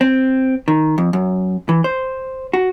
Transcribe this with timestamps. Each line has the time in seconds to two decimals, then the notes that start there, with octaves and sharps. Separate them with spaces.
0.01 C4
0.68 D#3
0.98 F2
1.13 F#2
1.69 E3
1.84 C5
2.53 F#4